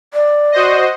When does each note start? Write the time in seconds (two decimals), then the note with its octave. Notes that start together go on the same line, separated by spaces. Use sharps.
0.14 D5
0.52 F#4 C5 D#5